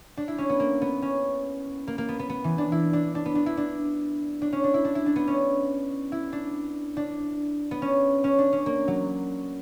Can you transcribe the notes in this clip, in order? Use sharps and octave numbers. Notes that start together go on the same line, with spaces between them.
D4
E4
C#4
B3
A#3
B3
C#4
A#3
A#3
B3
B3
B3
E3
D4
E4
D4
D4
B3
D4
E4
D4
D4
C#4
D4
E4
D4
E4
D4
B3
C#4
E4
D4
D4
B3
C#4
C#4
D4
C#4
A#3
F#3